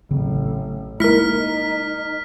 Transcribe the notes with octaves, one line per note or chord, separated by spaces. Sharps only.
A1 C#3 F#3 C4
G#3 A#3 D#4 E4 A#4 F6 B6